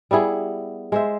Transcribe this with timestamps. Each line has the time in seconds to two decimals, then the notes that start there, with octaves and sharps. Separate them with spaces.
0.11 G3 B3 E4 G#4
0.92 G#3 C5 E5